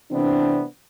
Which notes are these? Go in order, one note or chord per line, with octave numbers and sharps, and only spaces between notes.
C3 E3 A3 B3 C4 D4